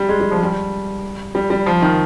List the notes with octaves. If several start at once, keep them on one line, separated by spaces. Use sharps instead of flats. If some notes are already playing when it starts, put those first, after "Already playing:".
Already playing: G3
G#3
G3
F3
G3
G3
G3
F3
D#3